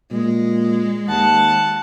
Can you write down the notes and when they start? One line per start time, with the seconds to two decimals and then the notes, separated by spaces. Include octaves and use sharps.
0.11 A#2 G#3
1.08 D#2 F#5 A5